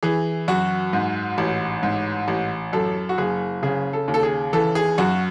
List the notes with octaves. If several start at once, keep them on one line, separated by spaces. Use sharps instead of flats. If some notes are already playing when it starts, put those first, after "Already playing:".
E3 G#4
F#2 F#4
G#2
A1
G#2
A1
F#2 A4
F#4
F#1 G#4
C#3 G#4
A4
D#2
A4
G#4
E3 A4
G#4
F#2 F#4